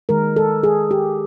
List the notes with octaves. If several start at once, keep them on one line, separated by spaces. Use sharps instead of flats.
D#3 G#3 A#4
A4
G#4
G4